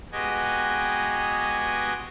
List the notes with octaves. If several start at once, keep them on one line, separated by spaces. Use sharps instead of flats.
G#3 B3 F#4 G4 D#5 G#5